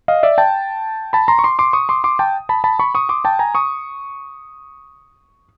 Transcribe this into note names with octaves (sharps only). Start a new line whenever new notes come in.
D#5 F5
D5 E5
G5 A5
A5 B5
A#5 C6
C#6
C6 D6
C6 D6
C#6 D#6
C6 D6
C6 D6
G5 A5
A5 B5
A5 B5
B5 C#6
C#6 D#6
C6 D6
G5 A5
G#5 A#5
C#6 D#6